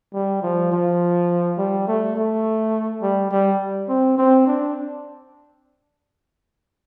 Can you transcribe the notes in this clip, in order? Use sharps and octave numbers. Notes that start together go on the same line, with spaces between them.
G3
F3
F3
G3
A3
A3
G3
G3
C4
C4
D4